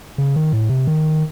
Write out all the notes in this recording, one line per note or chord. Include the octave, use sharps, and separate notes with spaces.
C#3
D#3
A2
C3
D#3